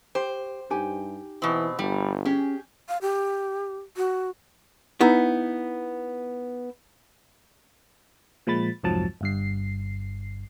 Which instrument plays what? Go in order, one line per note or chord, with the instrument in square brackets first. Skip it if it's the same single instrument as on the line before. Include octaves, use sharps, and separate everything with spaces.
[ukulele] G4 [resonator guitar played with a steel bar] C5
[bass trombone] G2 [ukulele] D#4 G4 G#5
[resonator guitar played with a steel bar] B2 C4 [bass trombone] E3
[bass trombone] G1 [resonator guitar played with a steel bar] G3
[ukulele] C#4 [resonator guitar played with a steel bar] G4 G#4
[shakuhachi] F5
G4
F#4
[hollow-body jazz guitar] B3 D#4 E4 A#5
[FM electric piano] A#2 F3 G#3 B5 A6
C2 F2 G#2 F3 F#3 A5
G1 G2 C7